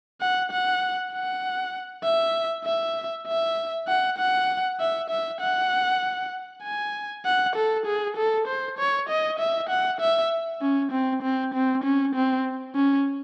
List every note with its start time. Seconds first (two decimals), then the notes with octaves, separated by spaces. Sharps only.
0.21 F#5
0.52 F#5
1.12 F#5
2.04 E5
2.65 E5
3.27 E5
3.88 F#5
4.18 F#5
4.80 E5
5.10 E5
5.41 F#5
6.64 G#5
7.25 F#5
7.55 A4
7.86 G#4
8.17 A4
8.47 C5
8.78 C#5
9.09 D#5
9.39 E5
9.69 F#5
10.01 E5
10.61 C#4
10.91 C4
11.22 C4
11.54 C4
11.84 C#4
12.15 C4
12.75 C#4